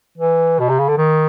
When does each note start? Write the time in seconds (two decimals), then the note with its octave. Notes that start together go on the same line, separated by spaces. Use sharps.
0.18 E3
0.60 B2
0.69 C3
0.79 C#3
0.88 D3
0.98 D#3